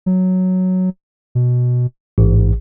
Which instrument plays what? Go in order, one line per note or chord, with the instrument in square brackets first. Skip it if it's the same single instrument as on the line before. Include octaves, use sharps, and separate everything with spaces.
[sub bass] F#3
B2
[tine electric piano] A1 [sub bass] G#2